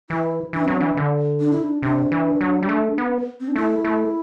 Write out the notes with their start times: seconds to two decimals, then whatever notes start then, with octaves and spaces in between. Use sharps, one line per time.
0.10 E3 E4
0.53 E3 D4
0.65 F#3 C4
0.75 D4
0.80 E3
0.97 D3
1.40 D4
1.51 E4
1.64 D4
1.82 C3 D4
2.12 E3
2.41 F#3
2.62 G3
2.69 A3
2.98 B3
3.40 C4
3.48 D4
3.56 A3 E4
3.84 A3